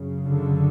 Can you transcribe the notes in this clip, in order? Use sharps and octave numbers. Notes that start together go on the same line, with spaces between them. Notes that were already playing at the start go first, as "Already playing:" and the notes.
Already playing: F#2 C#3
D3